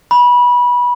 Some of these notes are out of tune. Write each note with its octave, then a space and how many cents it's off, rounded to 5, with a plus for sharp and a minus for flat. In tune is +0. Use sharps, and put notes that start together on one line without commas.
B5 -20